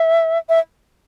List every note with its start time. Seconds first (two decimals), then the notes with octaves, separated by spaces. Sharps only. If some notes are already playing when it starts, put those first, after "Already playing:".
Already playing: E5
0.49 E5